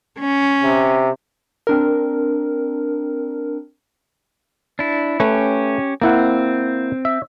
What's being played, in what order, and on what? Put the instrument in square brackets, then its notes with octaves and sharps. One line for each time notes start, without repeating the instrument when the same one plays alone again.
[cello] C#4
[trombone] C3
[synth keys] C4 D4 A#4
[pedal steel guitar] D4 E4
[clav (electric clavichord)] A3 B4 [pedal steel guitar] C#4 G4
[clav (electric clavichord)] A#3 E4 F#5 [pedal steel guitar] C4
[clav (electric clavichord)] E5